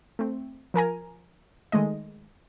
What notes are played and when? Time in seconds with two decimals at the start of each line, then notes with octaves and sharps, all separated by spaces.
0.19 A3 C4
0.74 F3 A#4 G#5 A#5
1.72 D#3 G#3 A3 D#5